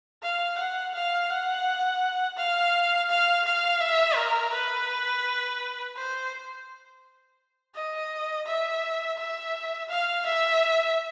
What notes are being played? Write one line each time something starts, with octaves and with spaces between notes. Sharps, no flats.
F5
F#5
F5
F#5
F5
F5
F5
E5
A#4
B4
C5
D#5
E5
E5
F5
E5